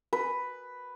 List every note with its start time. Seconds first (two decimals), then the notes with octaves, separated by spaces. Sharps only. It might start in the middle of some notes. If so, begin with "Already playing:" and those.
0.13 B4